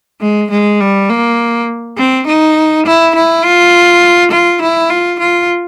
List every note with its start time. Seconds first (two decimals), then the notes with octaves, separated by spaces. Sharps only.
0.21 G#3
0.51 G#3
0.80 G3
1.09 A#3
1.98 C4
2.27 D#4
2.86 E4
3.15 E4
3.45 F4
4.31 F4
4.62 E4
4.90 F4
5.20 F4